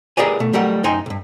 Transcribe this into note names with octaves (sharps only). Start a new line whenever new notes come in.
G4 G#4 A#4 B4 D5 G#5
B2 A3
F#3 G3 A3 A#4 F#5
F#2 D#4 G5 G#5 C6
B1 G2